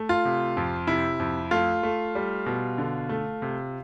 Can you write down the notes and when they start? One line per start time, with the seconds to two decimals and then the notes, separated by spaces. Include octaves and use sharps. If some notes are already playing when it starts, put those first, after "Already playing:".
Already playing: A3
0.09 F4
0.25 C3
0.57 F2
0.87 C3 E4
1.20 F2
1.51 A3 F4
1.83 A3
2.15 G3
2.46 B2
2.78 D3
3.09 A3
3.42 C3